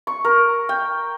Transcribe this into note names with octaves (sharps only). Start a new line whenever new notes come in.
C#6
A#4
G5